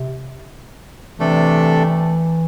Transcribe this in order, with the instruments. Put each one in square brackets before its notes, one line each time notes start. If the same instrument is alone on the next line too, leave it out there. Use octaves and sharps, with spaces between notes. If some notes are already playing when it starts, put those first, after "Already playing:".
Already playing: [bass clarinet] C3
[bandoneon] C3 A3 D4 A4 [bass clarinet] E3